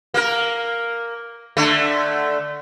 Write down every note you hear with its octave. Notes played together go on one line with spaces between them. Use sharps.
A#3 A#4
D3 A3